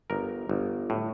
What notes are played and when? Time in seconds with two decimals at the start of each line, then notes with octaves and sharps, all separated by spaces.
0.10 G1 A#4
0.49 G1
0.90 A2